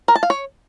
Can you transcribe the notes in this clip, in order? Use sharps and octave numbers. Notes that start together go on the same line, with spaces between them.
A#4
A5
F5
C#5